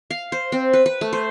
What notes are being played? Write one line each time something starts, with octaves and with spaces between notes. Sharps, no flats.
F5
C5
C4
B4
B4
A3
C5